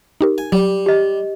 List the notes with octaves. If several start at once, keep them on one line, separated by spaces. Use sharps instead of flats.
D#4 G4 A#4
G#5
F#3 G3
G4 D#5